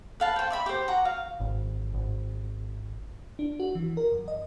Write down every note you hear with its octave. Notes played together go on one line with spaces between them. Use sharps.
B4 F5 A5
C5 G5
D5 E5 B5
G4 C5
F#4 A#5
F5
G#1
G#1
D4
F#4
E3
A#4
F#2
D#5